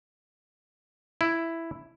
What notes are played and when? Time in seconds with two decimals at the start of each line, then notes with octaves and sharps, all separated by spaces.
1.21 E4